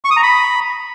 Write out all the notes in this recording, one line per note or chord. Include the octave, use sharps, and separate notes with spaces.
C#6
D#6
A#5
B5